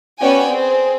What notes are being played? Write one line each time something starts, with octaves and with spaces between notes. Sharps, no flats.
B3 C#4 F#4 D5 G5 G#5
C4 G#4